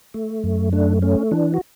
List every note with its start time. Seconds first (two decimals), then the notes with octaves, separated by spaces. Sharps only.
0.14 A3
0.44 F#2
0.72 A3 D4
1.02 A3 C#4
1.31 E3 D4
1.54 F#4